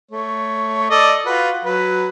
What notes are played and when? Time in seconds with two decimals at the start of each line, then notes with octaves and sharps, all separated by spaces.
0.11 A3 C#5
0.90 A4 D5 D#5
1.26 F4 F#4 B4
1.65 F#3 B4